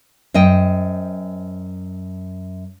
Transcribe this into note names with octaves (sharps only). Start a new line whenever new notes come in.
F#2 C5 D#5 G5